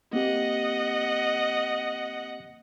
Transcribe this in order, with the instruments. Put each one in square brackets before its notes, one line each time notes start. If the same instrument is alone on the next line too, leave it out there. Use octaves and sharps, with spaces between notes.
[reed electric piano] A#3 C4 G4 [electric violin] D#5 F#5